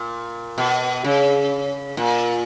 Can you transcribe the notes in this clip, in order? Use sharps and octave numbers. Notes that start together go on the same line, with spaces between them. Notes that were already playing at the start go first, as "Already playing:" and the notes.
Already playing: A#2
B2
C#3
A#2